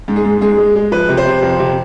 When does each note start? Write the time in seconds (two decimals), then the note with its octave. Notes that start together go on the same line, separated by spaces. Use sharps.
0.08 G#2
0.16 G#4
0.25 G#2
0.41 G#2 G#4
0.58 G#3
0.76 G#3
0.92 F3 B4
1.09 C3
1.17 C5
1.25 C3
1.43 F2
1.59 C3